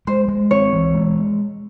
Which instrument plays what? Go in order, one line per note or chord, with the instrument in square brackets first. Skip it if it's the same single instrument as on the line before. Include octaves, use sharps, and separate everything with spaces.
[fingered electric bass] G#3 [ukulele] C5
[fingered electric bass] G#3
[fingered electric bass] C4 [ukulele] C#5
[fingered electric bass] E3
G#3